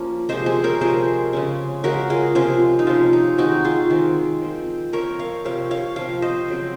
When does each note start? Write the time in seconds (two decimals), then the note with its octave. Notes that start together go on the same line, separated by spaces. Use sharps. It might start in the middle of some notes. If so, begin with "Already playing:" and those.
Already playing: F3 A#3 C#4
0.29 C3 F3 G#3 C5 D#5
0.46 G#4 C5
0.64 A#4 C#5
0.81 C3 F3 G#3 G#4 C5
1.33 C#3 G#3 C#4
1.83 C#3 G#3 C#4 F#4 A#4
2.10 F4 G#4
2.35 C3 F3 G#3 C#4 F4 G#4
2.79 D#4
2.87 C3 F3 G#3 C#4 F4
3.13 D#4
3.38 D#3 G#3 C4 D#4 F#4
3.65 F4 G#4
3.90 D#3 G#3 C4
4.41 F3 C4
4.93 F3 C4 A#4 C#5
5.19 C#5 F5
5.44 C3 F3 C4 C#5 F5
5.71 C#5 F5
5.96 C3 F3 C4 C#5 F5
6.22 C5 D#5
6.48 C#3 F#3 C4